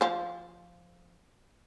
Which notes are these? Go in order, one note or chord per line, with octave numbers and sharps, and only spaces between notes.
F3 C5